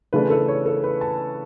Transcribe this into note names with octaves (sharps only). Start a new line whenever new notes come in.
C#3 E3 A3 D4 B4
A4
C#5
A4
B4
A5